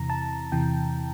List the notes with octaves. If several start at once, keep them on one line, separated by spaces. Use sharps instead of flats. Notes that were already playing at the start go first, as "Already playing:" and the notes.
Already playing: E2 C3 E3 A#5
A5
E2 C3 E3 G5